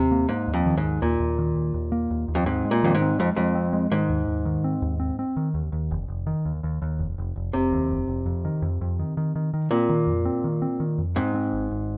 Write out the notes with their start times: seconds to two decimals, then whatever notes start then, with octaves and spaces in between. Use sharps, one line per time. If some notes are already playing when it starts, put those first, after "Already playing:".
Already playing: D#2 C3
0.11 A#3
0.29 G#2 A#3
0.48 D#2
0.54 F2
0.66 D#3
0.77 G#2
0.84 D#2
1.02 D#2 A#2
1.20 D#2
1.38 D#3
1.56 D#2
1.74 D#2
1.92 A#3
2.10 D#2
2.28 D#2
2.35 F2
2.46 G#2 C4
2.65 G#3
2.71 A#2
2.83 F2 D#3
2.95 G#2
3.02 C4
3.19 F2 G#3
3.36 F2 G#3
3.55 C4
3.73 G#3
3.92 G#2 D#3
4.10 D#2
4.28 D#2
4.45 D#3
4.64 C4
4.82 D#2
5.00 C4
5.19 C4
5.37 D#3
5.54 D#2
5.72 D#2
5.91 F1
6.08 F1
6.27 D#3
6.45 D#2
6.63 D#2
6.82 D#2
6.99 F1
7.18 F1
7.36 F1
7.53 F1 C3
7.73 D#2
7.91 F1
8.08 F1
8.26 F2
8.45 D#3
8.62 F2
8.81 F2
8.99 D#3
9.17 D#3
9.36 D#3
9.54 D#3
9.71 A#2 C4
9.89 D#3
10.07 F2
10.25 C4
10.44 D#3
10.62 C4
10.80 D#3
10.98 F2
11.16 G#2 C4
11.34 C4
11.53 G#1
11.71 G#1